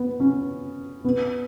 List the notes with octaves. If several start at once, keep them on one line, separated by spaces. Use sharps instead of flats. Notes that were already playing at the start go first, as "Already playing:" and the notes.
Already playing: B3
C#4
B3